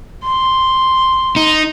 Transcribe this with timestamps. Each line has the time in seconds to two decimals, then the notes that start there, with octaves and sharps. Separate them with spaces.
0.23 C6
1.36 D#4